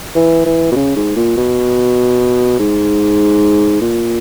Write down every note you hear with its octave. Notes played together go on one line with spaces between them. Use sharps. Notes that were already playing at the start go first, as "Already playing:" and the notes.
E3
E3
B2
C#3
G#2
A#2
B2
G#2
A#2